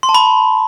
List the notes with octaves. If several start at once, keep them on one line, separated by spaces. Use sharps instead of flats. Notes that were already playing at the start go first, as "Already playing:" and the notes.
C6
A5
B5